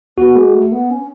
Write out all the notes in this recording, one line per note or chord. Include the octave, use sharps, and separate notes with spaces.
B3 F#4
G#3
A3
B3
C#4